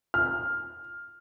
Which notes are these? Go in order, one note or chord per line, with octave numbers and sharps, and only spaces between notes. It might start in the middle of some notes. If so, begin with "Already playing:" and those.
F6